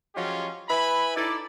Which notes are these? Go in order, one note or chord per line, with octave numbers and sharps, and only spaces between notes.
F3 F#3 G#3 C#4 F4 G4
E4 B4 E5 G#5 B5
D#4 E4 A4 D5